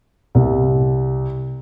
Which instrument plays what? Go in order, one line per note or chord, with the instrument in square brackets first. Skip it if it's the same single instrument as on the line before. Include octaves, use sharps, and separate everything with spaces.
[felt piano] C2